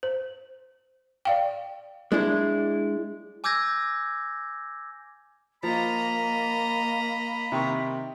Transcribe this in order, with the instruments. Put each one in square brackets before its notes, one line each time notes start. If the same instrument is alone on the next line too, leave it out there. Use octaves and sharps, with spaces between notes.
[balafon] C5
D5 F5 G5
[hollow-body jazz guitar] G#3 D4 E4
[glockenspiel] G#5 D6 E6 G6 G#6 A#6
[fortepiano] F3 [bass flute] A#3 [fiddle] D#5 A#5 [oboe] B5
[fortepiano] C3 D#3 C#6